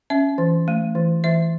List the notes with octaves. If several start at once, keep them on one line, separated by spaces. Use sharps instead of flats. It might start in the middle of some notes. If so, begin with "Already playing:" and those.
C#4 E5
E3
A3
E3
E3 E5